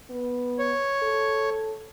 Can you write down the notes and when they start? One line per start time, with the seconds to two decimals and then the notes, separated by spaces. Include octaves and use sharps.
0.10 B3
0.59 C#5
1.03 A4